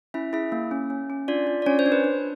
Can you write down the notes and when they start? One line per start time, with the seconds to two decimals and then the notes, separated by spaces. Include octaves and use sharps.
0.14 C#4 E4 E5
0.33 E4 G#4 E5
0.52 A#3
0.71 C#4
0.90 C#4
1.10 C#4
1.28 D4 F4 D5
1.47 F4
1.62 D5
1.66 C#4 D4 C#5
1.79 C5
1.86 D4
1.92 B4
2.04 D4